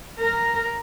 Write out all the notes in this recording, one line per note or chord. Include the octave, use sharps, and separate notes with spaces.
A#4